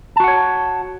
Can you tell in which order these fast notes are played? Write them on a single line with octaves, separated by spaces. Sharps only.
A5 F#4 F#5 C#5